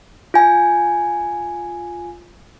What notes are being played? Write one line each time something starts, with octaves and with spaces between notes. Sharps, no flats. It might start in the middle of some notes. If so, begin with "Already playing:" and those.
F4 G#5